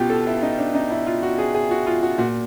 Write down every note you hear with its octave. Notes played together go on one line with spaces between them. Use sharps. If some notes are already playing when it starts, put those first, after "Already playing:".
Already playing: B2 F4 G4
A4
E4
D#4
D4
D#4
E4
F4
F#4
G#4
G#4
F#4
F4
F#4
A#2 F#4